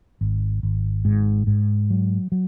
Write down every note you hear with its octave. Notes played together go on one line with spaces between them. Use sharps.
G#1
G#1
G#2
G#2
F#3
F#3